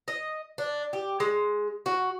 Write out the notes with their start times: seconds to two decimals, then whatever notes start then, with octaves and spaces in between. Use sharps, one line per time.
0.08 D#5
0.58 D4
0.93 G4
1.20 G#3
1.86 F#4